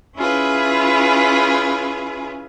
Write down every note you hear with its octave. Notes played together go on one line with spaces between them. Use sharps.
C#4 E4 F4 G#4 B4